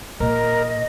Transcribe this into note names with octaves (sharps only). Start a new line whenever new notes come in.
A#2 A#4 D#5